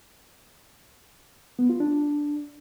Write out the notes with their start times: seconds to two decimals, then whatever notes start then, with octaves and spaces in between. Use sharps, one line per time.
1.59 B3
1.69 F4
1.80 D4